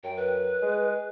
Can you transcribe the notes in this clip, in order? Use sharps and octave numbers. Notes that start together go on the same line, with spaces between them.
F#2 G5
B4
G#3